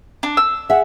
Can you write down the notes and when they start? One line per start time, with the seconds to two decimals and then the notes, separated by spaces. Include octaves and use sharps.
0.23 D4
0.37 E6
0.70 G#4 E5 F#5